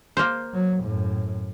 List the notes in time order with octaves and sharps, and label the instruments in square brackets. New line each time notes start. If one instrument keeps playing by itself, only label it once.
[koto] A#3 C5
[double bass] F#3
F#2 A2